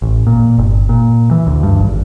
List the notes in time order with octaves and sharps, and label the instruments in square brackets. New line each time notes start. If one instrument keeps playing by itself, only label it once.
[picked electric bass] A1
A#2
G1
A#2
E3
D2
G2
G#1